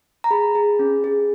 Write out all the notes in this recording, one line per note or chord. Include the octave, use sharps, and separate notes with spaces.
A#5
G#4 B5
G#4
C#4
G#4